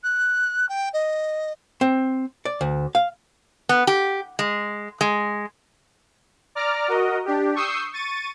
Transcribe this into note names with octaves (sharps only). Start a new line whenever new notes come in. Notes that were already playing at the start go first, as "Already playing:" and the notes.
F#6
G5
D#5
C4
D5
D2
F5
B3
G4
G#3
G#3
D5 A#5 D6 F6
F#4 A#4 D#5
D4 G4
C#6 D#6 E6 G6 C7
C#6 A6 D#7